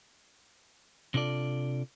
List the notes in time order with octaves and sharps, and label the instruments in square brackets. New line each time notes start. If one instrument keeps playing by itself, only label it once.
[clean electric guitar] C3 D4 F4 A4 D5